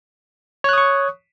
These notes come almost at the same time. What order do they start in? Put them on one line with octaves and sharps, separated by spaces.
C#5 F#6 D#6 C#6